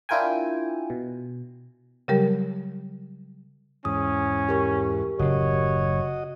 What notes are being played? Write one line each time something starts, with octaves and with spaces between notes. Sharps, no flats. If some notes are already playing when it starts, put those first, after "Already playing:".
D4 E4 F4 A#4 G5 G#5
B2
C#3 F#3 G3 G4 A#4
E2 G#2 C#4 D#6
G4 A#4 C#6
F#1 A2 C#3 F#4 C#5 D#5